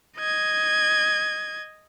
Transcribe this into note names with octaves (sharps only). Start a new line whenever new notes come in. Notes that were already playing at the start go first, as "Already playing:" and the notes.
D#5 G#6